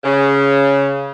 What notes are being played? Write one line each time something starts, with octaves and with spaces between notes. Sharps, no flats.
C#3